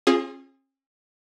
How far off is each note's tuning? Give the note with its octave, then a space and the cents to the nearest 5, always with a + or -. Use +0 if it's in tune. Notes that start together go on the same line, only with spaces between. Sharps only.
C#4 -45 F4 +0 G#4 +0